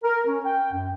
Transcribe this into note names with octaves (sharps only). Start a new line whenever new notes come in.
A#4
C#4
G5
F#2